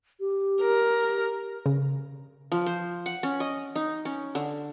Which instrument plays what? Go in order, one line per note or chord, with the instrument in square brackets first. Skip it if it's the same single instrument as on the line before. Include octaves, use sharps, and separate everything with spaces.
[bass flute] G4
[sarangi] A#4
[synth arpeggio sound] C#3
[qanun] F3
C5
F#5
C#4
D#5
D#4
C#4
D3